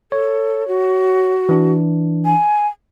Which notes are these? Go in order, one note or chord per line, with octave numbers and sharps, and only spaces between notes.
A4 C#5
F#4
E3 D4
G#5